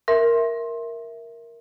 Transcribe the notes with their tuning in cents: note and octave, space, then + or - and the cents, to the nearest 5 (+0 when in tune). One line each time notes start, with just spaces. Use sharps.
A#4 +0 E5 +0 C6 +20